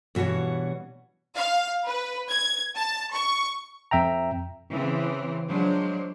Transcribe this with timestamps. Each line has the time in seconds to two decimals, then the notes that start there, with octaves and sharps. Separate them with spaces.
0.15 G2 B2 E3 F#4 C#5
1.36 F5
1.86 B4
2.30 G#6
2.76 A5
3.12 C#6
3.91 F2 E5 G5 A#5
4.72 C#3 E3 C4
5.49 F3 F#3 G#3 D4 C5